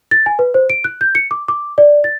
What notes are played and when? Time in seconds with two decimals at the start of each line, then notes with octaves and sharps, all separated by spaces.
0.11 A6
0.26 G#5
0.39 B4
0.54 C5
0.70 D7
0.84 F#6
1.01 G6
1.15 C#7
1.31 D6
1.48 D6
1.78 D5
2.04 A6